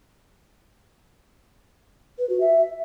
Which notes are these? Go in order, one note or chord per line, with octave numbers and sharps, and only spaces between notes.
B4
F#4
E5